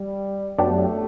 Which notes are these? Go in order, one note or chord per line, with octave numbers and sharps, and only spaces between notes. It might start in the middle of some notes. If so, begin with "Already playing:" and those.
Already playing: G3
F#2 F#3 A3 B3 D4 G4